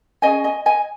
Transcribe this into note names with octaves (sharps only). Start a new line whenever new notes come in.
C#4 G#4 D#5 G#5
D#5 G#5
D#5 G#5